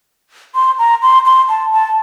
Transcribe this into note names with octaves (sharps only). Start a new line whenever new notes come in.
C6
A#5
C6
C6
A5
A5